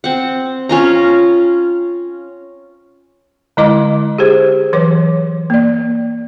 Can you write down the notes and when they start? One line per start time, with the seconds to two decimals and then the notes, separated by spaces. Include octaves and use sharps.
0.04 C4 F#5
0.69 C#4 F4 A#5
3.57 D3 G#3 E4 D#5 A#5 D6
4.18 G4 G#4 C5
4.73 E3 F#3 B4 C#5 D6
5.50 A#3 D5